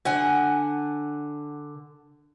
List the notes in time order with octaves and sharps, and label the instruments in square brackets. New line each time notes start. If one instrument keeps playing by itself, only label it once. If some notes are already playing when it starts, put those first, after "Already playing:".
[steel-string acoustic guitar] D3 F#5 G#5